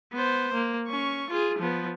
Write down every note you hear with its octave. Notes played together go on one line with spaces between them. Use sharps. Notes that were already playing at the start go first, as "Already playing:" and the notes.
B3 C5
A#3
C#4 C#6
F4 G#4
F3 B3